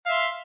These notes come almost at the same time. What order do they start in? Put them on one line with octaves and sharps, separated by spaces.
F5 E5 C6